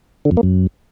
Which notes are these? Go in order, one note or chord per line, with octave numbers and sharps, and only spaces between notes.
D3
F2
A#3
F#2